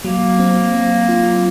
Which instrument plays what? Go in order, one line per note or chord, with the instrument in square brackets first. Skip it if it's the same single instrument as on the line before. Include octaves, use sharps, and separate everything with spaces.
[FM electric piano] F#3 [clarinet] A#3
[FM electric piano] C4
C4
F4